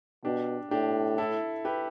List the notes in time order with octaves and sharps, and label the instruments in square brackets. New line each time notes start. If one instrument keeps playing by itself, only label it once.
[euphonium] B2 [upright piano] D4 G4
[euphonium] A2 [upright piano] D4 G4
[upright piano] E4 A4
G4 B4